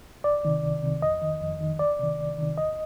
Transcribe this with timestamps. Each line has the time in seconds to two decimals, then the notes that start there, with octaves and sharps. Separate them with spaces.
0.24 C2 D5
0.45 C3 D#3
0.64 C2
0.83 C3 D#3
1.02 F2 D#5
1.22 D#3
1.41 F2
1.61 D#3
1.79 C2 D5
1.99 C3 D#3
2.19 C2
2.38 C3 D#3
2.57 D2 D#5